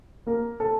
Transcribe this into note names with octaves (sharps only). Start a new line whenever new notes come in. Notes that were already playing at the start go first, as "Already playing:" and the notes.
A#3 A#4
A4